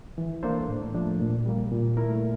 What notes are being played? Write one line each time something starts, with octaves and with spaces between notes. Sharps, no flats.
E3
A#3 D4 A4 C5
A2
F3 A3 D4
A#2
G3 A#3
A#2
A3 E4 A#4